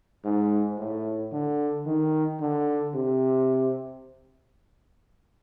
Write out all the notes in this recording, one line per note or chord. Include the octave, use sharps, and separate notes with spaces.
G#2
A2
D3
D#3
D3
C3